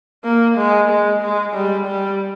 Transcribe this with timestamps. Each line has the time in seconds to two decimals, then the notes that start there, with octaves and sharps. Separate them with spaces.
0.25 A#3
0.58 G#3
0.90 G#3
1.22 G#3
1.54 G3
1.87 G3